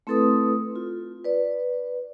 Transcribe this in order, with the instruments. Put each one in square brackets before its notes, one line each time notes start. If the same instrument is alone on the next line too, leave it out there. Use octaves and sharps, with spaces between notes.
[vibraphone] A3 C4 E4 A4 B4 D#6
F4
B4 D5